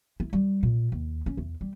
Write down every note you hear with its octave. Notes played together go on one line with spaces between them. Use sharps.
E4
G3
A#2
D#2
C#4
E2
G3